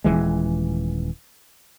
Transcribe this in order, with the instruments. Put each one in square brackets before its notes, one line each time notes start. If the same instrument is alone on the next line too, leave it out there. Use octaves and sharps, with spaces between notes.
[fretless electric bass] D#1 G#1 E3 G#3